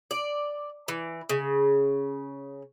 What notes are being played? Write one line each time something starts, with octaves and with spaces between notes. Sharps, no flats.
D5
E3
C#3